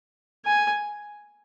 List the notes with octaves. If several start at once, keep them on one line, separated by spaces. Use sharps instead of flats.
G#5